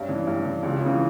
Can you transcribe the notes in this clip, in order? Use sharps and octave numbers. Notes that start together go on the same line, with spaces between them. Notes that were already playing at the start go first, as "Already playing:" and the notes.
Already playing: G2 C#4
E3
G2
E3
C#2
C#3 E3